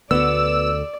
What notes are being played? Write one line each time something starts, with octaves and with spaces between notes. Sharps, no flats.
D2 D3 B3 F#4 D5 E6